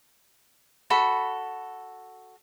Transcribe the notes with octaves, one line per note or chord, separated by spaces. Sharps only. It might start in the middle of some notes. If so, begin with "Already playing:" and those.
F#4 A4 B5